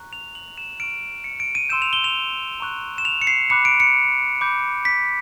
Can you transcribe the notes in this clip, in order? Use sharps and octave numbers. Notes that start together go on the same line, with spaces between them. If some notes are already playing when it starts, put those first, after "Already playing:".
Already playing: A#5 C#6 F#6
F7
F#7
E7
C#6 F6 D7
C#7
D7
D#7
C6 E6 G6 E7
F7
G7
F7
A#5 C#6 F#6
E7
F7
C#7
C7
B5 D6 F#6 C#7
D7
C#7
B5 D6 G6
B6